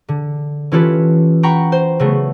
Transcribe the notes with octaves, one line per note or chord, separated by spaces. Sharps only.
D3
E3 C#4 F4 G4 A4 B4
F#5 G5 A#5 B5 C#6
C5
C#3 F#3 A3 B3